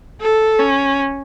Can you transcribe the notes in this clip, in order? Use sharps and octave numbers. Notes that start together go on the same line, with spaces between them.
A4
C#4